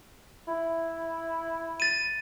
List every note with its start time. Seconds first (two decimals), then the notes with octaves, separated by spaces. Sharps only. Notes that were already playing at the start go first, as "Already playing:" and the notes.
0.48 E4
1.80 A6 D#7